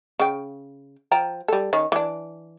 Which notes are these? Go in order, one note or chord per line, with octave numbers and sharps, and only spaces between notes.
C#3 G5
F3 G5 A#5
G3 A4
D#3 C#4
E3 D4